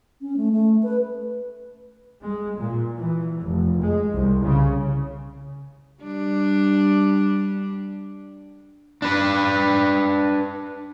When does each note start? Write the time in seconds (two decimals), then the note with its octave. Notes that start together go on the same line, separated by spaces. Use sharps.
0.21 C#4
0.37 A3
0.52 A3
0.83 B4
2.22 G#3
2.59 A#2
2.97 E3
3.41 F1
3.81 G#3
4.14 C2
4.43 C#3
6.04 G3 D4
9.02 D4 B4